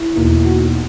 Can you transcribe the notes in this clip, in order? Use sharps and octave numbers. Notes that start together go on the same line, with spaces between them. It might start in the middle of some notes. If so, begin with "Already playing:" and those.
Already playing: E4
E2 B2 A#3 D#4
F#4